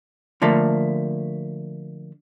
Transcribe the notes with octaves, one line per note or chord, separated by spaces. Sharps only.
D3 F3 A3 A#3